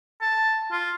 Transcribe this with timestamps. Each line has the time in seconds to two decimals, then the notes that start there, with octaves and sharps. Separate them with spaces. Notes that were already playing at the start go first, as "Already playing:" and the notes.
0.21 A5
0.71 F4